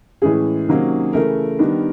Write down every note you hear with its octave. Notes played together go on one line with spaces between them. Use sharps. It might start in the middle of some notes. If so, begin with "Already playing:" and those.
A2 E3 G#3 C#4 G#4
C3 D#3 F#3 A#3 C#4
C#3 E3 A3 C#4 A#4
D#3 G3 B3 D4